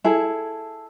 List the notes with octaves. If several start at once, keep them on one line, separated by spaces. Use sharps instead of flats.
E4 G#4 A4